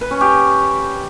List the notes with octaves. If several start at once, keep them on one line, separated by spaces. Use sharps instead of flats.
B4
C#4
G4